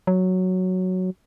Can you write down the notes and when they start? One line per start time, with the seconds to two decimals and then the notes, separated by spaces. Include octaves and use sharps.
0.07 F#3